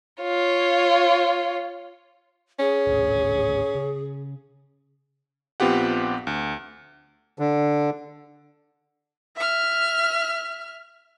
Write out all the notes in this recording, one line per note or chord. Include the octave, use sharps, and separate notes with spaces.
F4 C#5
C#4 G#4
D1 G#1 D2
C#3
A#1 B3 C4 F4 G4 F#5
D2
D3
E5 F6